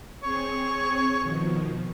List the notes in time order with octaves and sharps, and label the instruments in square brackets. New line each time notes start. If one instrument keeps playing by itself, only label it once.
[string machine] C4 G#4 [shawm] C#5
[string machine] B2 D#3 F3